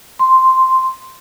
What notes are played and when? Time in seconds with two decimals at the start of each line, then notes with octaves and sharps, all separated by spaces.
0.19 C6